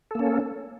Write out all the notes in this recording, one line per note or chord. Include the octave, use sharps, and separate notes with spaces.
A#3 C#4 A4